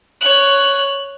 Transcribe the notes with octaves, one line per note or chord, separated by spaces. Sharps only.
C#5 F#6